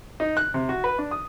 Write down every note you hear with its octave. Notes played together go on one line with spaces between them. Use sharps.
D#4
F#6
C3
F#4
B4
D4
D#6